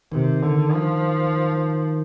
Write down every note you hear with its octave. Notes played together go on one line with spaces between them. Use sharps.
C3 D#3
D3
F3